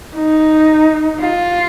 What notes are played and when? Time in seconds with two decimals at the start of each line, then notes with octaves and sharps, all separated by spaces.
0.15 D#4
1.20 F4